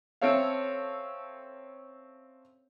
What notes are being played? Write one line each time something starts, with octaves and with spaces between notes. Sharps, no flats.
C4 C#4 A4 C#5 E5 F5